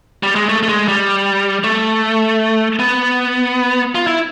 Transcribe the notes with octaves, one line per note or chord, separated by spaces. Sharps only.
G3
G#3
A3
A3
G#3
G3
A3
B3
F4
E4